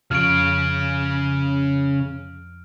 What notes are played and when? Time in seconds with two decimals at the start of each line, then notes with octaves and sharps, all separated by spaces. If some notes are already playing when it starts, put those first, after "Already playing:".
0.11 F2 C#3 F3 C#5 C#6 F6 D7